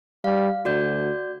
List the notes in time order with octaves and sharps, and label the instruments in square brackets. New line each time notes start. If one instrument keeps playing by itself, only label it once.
[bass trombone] G3 [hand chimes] F5
[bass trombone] D2 [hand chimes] F#4 D5 G6